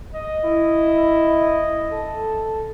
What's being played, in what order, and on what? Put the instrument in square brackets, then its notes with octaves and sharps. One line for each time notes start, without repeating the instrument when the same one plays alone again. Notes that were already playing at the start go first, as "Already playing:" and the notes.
[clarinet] D#5
[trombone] E4
A4